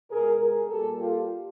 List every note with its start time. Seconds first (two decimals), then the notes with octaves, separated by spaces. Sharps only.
0.11 B2 G#3 G#4 A#4
0.41 G#4 A#4
0.69 A#2 G3 G4 A4
0.98 F4 G4